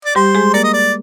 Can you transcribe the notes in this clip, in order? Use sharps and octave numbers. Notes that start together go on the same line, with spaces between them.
D5
G3 G4 C5
G#3 G#4
A#3 A#4 D5
D#5
D5